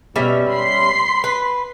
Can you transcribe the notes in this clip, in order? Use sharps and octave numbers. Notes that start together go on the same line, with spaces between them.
B2 G3 C#4 E5
B5 C6 C7
B4